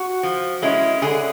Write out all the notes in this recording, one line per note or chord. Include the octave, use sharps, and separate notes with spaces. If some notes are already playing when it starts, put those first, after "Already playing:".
Already playing: F#4
F3
G#3 C#4 E4
D3 G#4